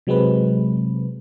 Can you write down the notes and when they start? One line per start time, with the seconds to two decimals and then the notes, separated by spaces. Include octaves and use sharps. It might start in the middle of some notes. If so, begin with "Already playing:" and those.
0.07 C3 F#3 G#3 C4 B4